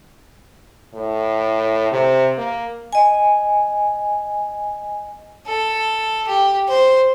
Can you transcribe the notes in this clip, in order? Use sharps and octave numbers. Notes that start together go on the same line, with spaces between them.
A2
C3
A#3
D#5 G#5
A4
G4
C5